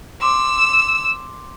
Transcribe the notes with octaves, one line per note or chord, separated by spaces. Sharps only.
C6 D6 E6